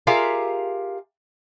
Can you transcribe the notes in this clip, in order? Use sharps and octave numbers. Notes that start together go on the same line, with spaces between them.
F4 G4 G#4 A#4 E5 F5